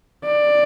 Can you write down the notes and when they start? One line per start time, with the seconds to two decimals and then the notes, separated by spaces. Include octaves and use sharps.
0.25 D5